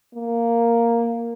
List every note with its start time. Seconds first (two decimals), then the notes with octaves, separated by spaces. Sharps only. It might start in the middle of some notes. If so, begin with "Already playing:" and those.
0.15 A#3